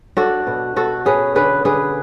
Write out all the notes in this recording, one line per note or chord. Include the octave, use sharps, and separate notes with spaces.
D4 F#4 A4
B2
B2 F#4 A4
C#4 G#4 B4
D3 G#4 B4
D3 G#4 B4